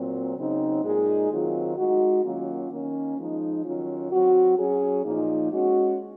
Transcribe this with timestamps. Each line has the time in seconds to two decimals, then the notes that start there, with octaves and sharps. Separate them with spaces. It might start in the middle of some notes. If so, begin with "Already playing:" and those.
Already playing: A#2 F#3 C4
0.37 C#3 F#3 C4 D#4
0.84 A#2 G#3 D#4 G#4
1.31 D#3 F#3 C4 F4
1.77 G#3 D#4 F#4
2.24 D#3 F#3 A#3 C#4 F4
2.71 D#3 A#3 C#4
3.18 F3 G#3 D#4
3.65 D#3 F#3 C#4 F4
4.11 F#3 C4 F#4
4.58 F#3 C#4 G#4
5.05 A#2 F3 A#3 D#4
5.52 G#3 C#4 F#4